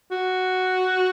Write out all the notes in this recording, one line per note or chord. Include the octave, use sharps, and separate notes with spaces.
F#4